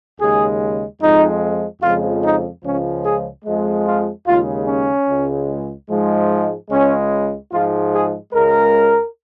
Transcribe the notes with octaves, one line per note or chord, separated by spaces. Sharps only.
D#2 C#3 G#3 G#4
F2 F3 G#3 D#4
F2 C#3 F3 G#3 F4
D#4
C#2 C#3 F3 G#3 C#4
G#4
F2 F3 G#3
F4
D#2 C#3 G#3 F4
C#4
C#2 C#3 G#3
G#2 F3 G#3
C#2 C#3 G#3 C#4
G#2 F3 G#3 F4
G#4
C#2 C#3 G#3 A#4